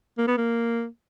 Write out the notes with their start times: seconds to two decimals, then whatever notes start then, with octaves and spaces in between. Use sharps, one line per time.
0.17 A#3
0.27 B3
0.37 A#3